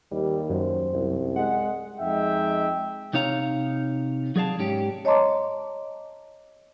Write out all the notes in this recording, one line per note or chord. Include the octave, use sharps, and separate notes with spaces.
D#2 G3
F#2 C5
C2
G#3 F#5
F2 G#3 D#4 E5 G5
C3 D#4 C#5 F5 A#5
F#3 G#4 D5 F5 A5
G#2 C#4 G4
C#5 D#5 A5 A#5 C6 D6